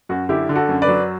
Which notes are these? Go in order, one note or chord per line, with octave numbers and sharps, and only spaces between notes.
F#2 F#4
D3 E4 G4
D3
F#4 A4
F#2
B4 D5
F#3